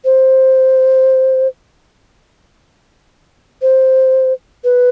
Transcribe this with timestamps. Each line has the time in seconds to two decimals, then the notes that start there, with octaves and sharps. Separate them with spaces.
0.05 C5
3.62 C5
4.64 B4